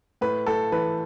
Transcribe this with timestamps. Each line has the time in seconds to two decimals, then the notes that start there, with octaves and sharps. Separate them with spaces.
0.21 A2 B4
0.47 A2 A4
0.72 E3 B4